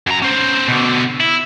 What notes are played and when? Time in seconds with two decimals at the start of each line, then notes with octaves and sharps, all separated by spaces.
0.07 F#2 A#5
0.22 C#4 C5
0.68 B2 D3
1.20 E4